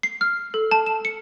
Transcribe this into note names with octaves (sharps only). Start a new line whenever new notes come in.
C7
F6
A4
A5
E7
C#7